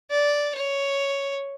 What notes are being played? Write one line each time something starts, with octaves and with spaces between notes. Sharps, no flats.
D5
C#5